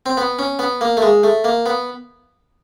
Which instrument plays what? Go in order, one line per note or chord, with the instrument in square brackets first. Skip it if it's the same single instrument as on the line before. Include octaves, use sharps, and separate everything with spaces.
[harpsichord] C4
B3
C#4
B3
A#3
A3
G#3
A3
A#3
B3